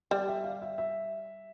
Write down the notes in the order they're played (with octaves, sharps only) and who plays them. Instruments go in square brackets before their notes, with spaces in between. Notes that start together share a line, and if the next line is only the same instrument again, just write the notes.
[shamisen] G3 [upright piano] D5
[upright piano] E5
F5
E5
E5